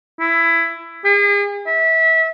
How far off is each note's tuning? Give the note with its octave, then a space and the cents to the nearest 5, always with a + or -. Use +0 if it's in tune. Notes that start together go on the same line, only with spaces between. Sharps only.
E4 +15
G#4 -40
E5 -25